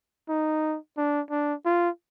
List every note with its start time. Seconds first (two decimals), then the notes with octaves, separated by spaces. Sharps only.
0.29 D#4
0.97 D4
1.30 D4
1.65 F4